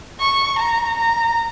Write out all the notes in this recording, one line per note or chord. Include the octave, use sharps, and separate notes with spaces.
C#6
A#5
A#5